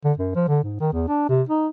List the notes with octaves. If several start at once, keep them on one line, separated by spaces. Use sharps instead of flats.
D3
F#2
F3
D3
G#2
D#3
E2
D4
C3
D#4